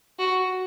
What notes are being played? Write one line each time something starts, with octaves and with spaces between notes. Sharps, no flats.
F#4